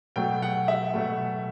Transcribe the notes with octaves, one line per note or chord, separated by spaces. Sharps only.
B2 F#3 A3 G5
F#5
E5
B2 F#3 A3